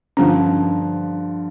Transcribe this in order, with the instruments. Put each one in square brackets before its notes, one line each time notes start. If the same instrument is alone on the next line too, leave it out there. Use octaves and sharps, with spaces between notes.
[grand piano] G2 D3 F3 [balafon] C#4